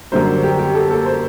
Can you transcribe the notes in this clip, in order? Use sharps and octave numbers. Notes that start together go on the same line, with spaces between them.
F#2 D3 G3 C5
G4
G4
A4
A4
C5